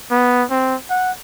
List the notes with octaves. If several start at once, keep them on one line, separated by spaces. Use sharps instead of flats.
B3
C4
F#5